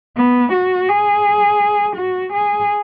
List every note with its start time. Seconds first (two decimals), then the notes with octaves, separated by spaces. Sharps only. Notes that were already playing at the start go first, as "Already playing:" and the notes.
0.17 B3
0.53 F#4
0.88 G#4
1.96 F#4
2.33 G#4